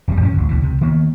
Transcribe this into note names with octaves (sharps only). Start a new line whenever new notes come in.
E1 F2 E3 G3
G2 F3 C4 C#4
A1 D2 D3
C#2 B2 E3
C#2 C3
D#3 A#3 B3